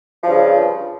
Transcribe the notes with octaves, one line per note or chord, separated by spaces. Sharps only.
G2 C#3 F3